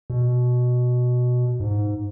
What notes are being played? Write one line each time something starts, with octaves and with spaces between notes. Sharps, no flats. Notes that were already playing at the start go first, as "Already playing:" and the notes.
B2
G#2